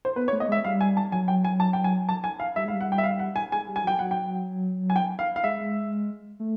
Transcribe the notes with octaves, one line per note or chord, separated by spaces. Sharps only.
C5
B3 B4
C#5
A3
D#5
G#3 E5
G3 F5
G#5
A5
F#3 G#5
G5
G#5
A5
G5
G#5
A5
G#5
F5
G3 E5
G#3 F5
G3
F#5
G5
E5
F5
F#5
G#5
G#3 G#5
G3
G#5
F#3 G5
F#3 F#5
G5
G#5
G5
F5
F5
G#3 E5
A3